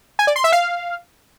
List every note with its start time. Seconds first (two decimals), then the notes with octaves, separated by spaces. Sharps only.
0.19 G#5
0.27 D5
0.36 C6
0.44 E5
0.52 F5